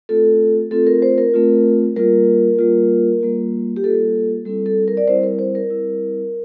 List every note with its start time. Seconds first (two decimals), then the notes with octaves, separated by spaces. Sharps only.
0.09 A3 C4 F4 A4
0.71 A3 C4 F4 A4
0.87 A#4
1.02 C5
1.18 A#4
1.34 A3 C4 F4
1.96 G3 A#3 F4 A#4
2.59 G3 A#3 F4
3.21 G3 A#3 F4
3.76 G4
3.84 G3 A#3 F4 A4
4.45 G3 C4 E4 A4
4.66 A4
4.88 A#4
4.97 D5
5.07 G3 C4 E4 C5
5.23 A#4
5.39 C5
5.55 A#4
5.70 G3 C4 E4